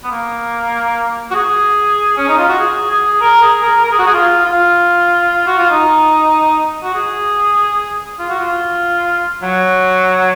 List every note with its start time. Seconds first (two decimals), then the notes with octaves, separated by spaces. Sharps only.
0.04 B3
0.11 A#3
1.31 F#4
1.35 G#4
2.18 C#4
2.28 D#4
2.38 F4
2.49 F#4
2.59 G#4
2.90 G#4
3.21 A#4
3.42 G#4
3.63 A#4
3.83 A#4
3.91 G#4
3.99 F#4
4.07 G#4
4.14 F4
4.46 F4
5.47 F#4
5.58 F4
5.70 D#4
6.83 F#4
6.94 G#4
8.19 F4
8.29 F#4
8.39 F4
9.43 F#3